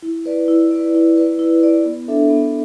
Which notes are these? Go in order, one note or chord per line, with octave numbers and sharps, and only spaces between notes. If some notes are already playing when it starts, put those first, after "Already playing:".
E4
B4 D5
E4
B4 D5
E4
B4 D5
E4
B4 D5
B3
D4 A4 E5
B3